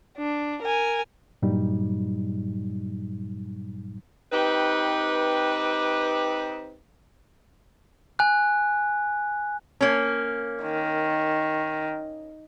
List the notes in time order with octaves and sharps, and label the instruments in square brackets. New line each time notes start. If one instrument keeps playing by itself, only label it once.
[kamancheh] D4
A#4 G#5
[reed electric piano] G2 A#2 F#3 G3 D#4
[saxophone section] C4 D#4 G4 B4
[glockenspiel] G#5 F#6
[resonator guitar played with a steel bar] A#3 C#4
[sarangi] D#3